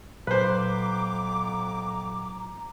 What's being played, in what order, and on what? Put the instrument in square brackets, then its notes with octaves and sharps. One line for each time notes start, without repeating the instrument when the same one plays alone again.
[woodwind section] F2 B3 D6 [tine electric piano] A#2 F#3 [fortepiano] B4 C5 [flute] A#5